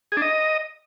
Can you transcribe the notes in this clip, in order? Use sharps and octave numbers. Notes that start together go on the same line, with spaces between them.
G#4
D4
D#5